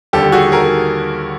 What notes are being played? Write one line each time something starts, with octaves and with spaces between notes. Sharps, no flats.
D#2 D3 G3 G4 A4
F#4 G#4
G#4 A#4